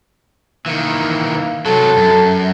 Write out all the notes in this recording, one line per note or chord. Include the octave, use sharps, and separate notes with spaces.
D#3 E3 A#3
C3 F#3 A4
F#2